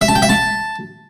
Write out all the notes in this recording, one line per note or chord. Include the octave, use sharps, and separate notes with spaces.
E5
A5
G5
E5
A5